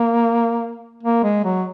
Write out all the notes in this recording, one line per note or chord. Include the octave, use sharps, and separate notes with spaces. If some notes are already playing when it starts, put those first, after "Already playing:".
Already playing: A#3
A#3
G#3
F#3